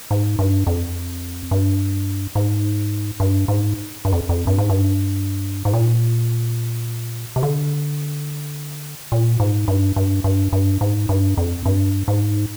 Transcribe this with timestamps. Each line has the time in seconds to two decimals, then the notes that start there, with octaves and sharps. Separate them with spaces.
0.11 G#2
0.39 G2
0.67 F2
1.51 G2
2.35 G#2
3.20 G2
3.48 G#2
4.05 G2
4.12 F2
4.29 F2
4.47 G2
4.58 G#2
4.69 G2
5.65 G#2
5.73 A#2
7.36 C3
7.43 D3
9.12 A#2
9.40 G#2
9.68 G2
9.96 G2
10.24 G2
10.53 G2
10.81 G#2
11.09 G2
11.37 F2
11.65 G2
12.08 G#2